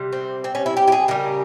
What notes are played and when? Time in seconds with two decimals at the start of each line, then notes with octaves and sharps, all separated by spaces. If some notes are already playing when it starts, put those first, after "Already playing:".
Already playing: C3 G3
0.12 C4
0.44 C4
0.55 C#4
0.66 E4
0.77 G4
0.88 G4
0.92 G#4
1.08 C#3 G3 A#4